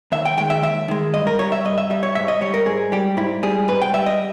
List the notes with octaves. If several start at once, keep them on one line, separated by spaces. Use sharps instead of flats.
D#2 E5
G5
D#3 G#3 G5
E5
D#2 E5
D#3 G#3
G2 D#5
A#4
G3 C#5
E5
G2 D#5
E5
G3 E5
C#5
G#2 E5
D#5
G3 C#5
A#4
G#2 G#4
G3 G4
G#2 E4
G3 G#4
G#2 B4
G5
G3 E5
D#5